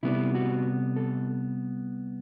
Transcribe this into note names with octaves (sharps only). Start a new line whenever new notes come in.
C2 C3 G3 B3 E4
F#4
A4